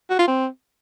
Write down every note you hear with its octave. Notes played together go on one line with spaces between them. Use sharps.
F#4
F4
C4